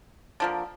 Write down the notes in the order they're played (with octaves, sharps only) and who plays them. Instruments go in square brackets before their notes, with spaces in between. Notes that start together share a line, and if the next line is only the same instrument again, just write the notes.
[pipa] D3 F3 A#3